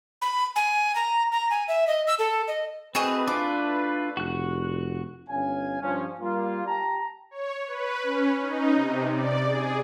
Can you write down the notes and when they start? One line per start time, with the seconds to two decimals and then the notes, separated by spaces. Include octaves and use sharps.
0.22 B5
0.56 G#5
0.95 A#5
1.32 A#5
1.50 G#5
1.68 E5
1.87 D#5
2.07 E6
2.19 A4
2.48 D#5
2.95 A3 C4 E4 F#4 G#4 B4 D#5
3.28 D4 F4 D6
4.17 F1 F#4 F#6
5.30 G1 C#4 F5 G#5
5.82 G2 F3 C#4
6.20 G3 A#3 F4
6.67 G4 G5 A5 A#5
7.31 C#5
7.66 B4
8.03 C#4
8.41 D#4
8.75 C3
9.12 D5
9.45 G#4